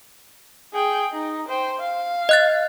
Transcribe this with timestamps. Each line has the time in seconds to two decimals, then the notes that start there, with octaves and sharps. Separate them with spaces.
0.74 G#4 G5
1.12 D#4
1.48 C5 G5
1.79 F5
2.29 D#5 F#6 A6